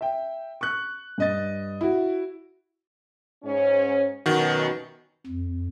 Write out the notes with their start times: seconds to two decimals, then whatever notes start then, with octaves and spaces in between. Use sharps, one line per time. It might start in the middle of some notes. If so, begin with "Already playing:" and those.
0.01 E5 G5
0.61 C#6 F#6
1.18 G2 D#5 A6
1.81 E4 F#4
3.43 G#2 C#4
4.26 F#2 B2 D#3 F#4
5.26 F2